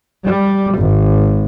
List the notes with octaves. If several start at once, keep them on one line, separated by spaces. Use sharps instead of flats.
G3
G#1